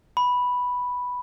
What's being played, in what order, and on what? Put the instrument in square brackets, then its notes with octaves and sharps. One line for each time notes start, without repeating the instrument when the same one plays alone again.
[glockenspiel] B5